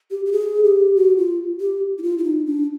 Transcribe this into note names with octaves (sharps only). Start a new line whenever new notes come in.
G4
G4
G#4
G4
F#4
F4
G4
E4
F4
E4
D#4
D4